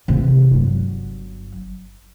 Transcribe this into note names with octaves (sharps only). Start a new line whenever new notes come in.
C3 E3
G1 F#3